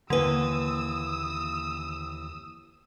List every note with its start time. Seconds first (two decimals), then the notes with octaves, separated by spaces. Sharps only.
0.10 D#2 D3 E3 A#3 B4 D#6 E6